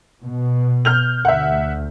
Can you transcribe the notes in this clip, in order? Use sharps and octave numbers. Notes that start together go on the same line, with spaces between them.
B2
F6 G6 F7
D2 E5 F#5